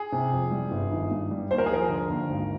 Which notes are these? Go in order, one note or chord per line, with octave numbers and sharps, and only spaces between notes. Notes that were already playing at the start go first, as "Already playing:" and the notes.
Already playing: G#4
C3
F2
G3
G1
D#3
G2
G3
D#2 C5
A#4
G#4
F3 A#4
D3
D#2
G#1